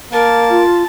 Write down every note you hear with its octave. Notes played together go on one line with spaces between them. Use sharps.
A#3 A#4 A5
F4